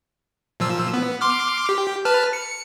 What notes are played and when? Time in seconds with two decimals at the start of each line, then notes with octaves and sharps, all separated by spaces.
0.60 A#2 F3 E6
0.94 B3
1.21 C6 D6 F6
1.69 G4
2.05 B4 A5 F6
2.33 C#7